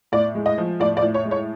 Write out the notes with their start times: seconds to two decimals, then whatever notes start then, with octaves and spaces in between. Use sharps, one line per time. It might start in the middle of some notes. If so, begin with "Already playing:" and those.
0.12 A2 D5
0.35 G#3
0.46 D#5
0.58 F3
0.80 A2 D5
0.97 D5
1.02 A2
1.14 C#5
1.25 G#3
1.31 C#5